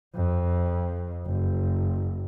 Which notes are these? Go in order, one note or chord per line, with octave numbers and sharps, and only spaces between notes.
F2
F#1